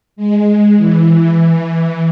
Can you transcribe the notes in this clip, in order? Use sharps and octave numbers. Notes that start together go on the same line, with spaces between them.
G#3
E3